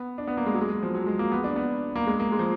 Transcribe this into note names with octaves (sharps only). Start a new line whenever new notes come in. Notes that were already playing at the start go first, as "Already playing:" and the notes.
Already playing: B3
D4
B3
A#3
G#3
F#3
G#3
F3
F#3
G#3
A#3
B3
D4
B3
A#3
G#3
A#3
G#3
F3